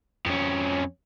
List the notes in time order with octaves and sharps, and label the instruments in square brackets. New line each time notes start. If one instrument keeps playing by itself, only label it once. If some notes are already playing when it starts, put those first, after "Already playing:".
[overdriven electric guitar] F2 C#4